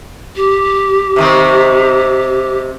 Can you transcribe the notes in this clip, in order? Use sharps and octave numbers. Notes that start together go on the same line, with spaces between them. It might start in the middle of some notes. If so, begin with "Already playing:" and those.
G4
C3 D#3 C4